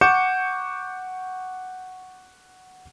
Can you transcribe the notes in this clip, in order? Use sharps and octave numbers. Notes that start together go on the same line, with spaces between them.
F#5 C#6 D6 G6 C#7 E7